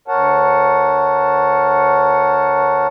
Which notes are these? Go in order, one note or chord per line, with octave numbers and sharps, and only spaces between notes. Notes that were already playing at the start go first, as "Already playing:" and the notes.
D2 A#4 C#5 F#5 A5